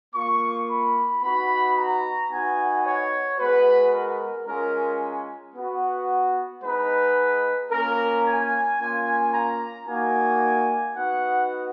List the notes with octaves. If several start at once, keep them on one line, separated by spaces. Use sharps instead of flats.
A#3 F4 C#6
B5
B3 D#4 F#4 B5
A#5
B3 D#4 F#4 G#5
C#5
G#3 B3 F#4 B4
A#4
G#3 C#4 F4 A#4
B3 F#4
G#3 B3 D#4 B4
A#3 C#4 F4 A#4
G#5
A#3 C#4 F4 G#5
A#5
A#3 D#4 F#4 G#5
B3 D#4 F#4 F#5